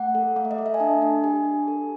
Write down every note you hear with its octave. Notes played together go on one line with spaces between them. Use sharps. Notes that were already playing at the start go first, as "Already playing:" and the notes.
Already playing: A3 F#5
A4
A3 F5
E5
D#5
A4
E5
G#5
D4 A5
D4
G4 G#5
D4
A4